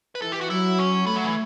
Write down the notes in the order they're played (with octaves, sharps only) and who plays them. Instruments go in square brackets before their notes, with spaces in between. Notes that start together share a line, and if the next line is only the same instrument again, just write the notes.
[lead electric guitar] B4
[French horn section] E3 [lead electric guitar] A4
[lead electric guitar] G4
F#4
[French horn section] F#3 [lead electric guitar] E4
[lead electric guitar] C#4
[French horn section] A3 [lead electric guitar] B3
[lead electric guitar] F#3
E3